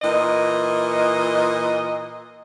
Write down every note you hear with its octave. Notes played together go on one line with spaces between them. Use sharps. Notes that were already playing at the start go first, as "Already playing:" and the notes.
A#2 E3 D#5